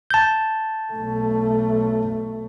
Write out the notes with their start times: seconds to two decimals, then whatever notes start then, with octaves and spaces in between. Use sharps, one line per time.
0.11 A5 G6
0.93 B1 A3